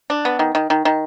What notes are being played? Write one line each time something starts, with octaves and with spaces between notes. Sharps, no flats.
D4
B3
D#3
D#3
D#3
D#3